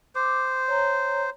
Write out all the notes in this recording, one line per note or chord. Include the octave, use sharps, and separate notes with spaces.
C5 D6
C#5 A#5